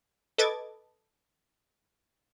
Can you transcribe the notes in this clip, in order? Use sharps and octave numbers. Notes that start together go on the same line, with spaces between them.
A4 B4 D#5 D6 G#6 A6